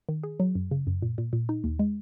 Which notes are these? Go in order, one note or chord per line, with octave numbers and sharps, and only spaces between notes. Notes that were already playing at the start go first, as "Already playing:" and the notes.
D#3
G#4
F#3
F#2
C#3
F#2
A#2
A#2
A#2
D#4
D#2
G#3